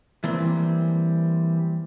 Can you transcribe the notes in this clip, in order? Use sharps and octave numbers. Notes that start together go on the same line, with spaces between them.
E3 G3 A#3 C4